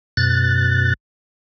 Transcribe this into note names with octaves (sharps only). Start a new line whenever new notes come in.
F#2 B2 F#6 A6